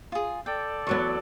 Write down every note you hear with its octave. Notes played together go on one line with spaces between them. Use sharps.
F4 G#4
A4 D5 G5
E2 F#3 B3 C#6